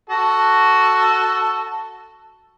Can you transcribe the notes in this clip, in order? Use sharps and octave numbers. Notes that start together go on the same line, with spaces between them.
F#4 A4